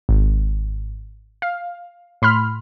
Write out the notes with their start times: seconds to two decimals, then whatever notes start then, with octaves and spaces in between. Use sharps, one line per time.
0.09 G#1
1.42 F5
2.22 A2 B5 C6 F6